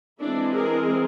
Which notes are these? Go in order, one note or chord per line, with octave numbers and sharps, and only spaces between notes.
E3 G#3 C4 D4 E4
G#4 A#4